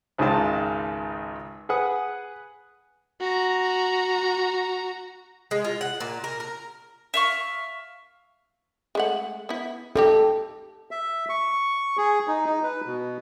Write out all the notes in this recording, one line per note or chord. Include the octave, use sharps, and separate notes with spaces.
G#1 C#2 D#3 G#3 F4 A5
G#4 B4 F#5 D#6
F#4 A#5
G#3
F4
F#5
A#2
A#4
A#4
E5 F5 C#6
G#3 A3 F#5
B3 E4
G3 D#4 G4 A4
E5
C#6
G#4
D#4
D#4
B4
B2